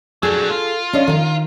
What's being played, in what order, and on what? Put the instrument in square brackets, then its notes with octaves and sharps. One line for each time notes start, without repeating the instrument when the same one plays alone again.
[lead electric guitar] F#3 D4 [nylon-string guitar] G#4 A4
[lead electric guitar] F4
[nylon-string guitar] C#4 D4 D#5
D#3 F5